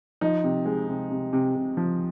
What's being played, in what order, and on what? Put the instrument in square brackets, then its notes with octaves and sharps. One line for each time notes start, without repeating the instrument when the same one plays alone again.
[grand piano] F3 D#4
C3
G#3
C3
C3
C3
C3
F3